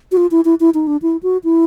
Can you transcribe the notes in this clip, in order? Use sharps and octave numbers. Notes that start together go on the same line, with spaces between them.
F#4
F4
E4
E4
E4
D#4
D4
E4
F#4
E4